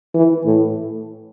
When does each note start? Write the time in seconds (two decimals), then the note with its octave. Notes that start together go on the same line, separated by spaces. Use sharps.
0.15 E3
0.45 A2